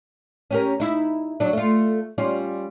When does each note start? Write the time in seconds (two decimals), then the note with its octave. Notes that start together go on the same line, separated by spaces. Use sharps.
0.51 C#4 G4 A#4
0.80 D#4 E4
1.40 F#3 D4
1.53 A3 F4
2.18 G3 C#4 F4